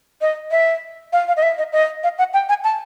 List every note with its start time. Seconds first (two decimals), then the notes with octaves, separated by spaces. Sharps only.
0.21 D#5
0.51 E5
1.13 F5
1.28 F5
1.37 D#5
1.43 E5
1.58 D#5
1.73 D#5
2.04 F5
2.18 F#5
2.34 G5
2.49 G#5
2.64 A5